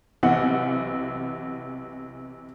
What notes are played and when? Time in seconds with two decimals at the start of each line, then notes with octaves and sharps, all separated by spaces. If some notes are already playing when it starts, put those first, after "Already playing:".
0.23 B1 C3 E3 F#5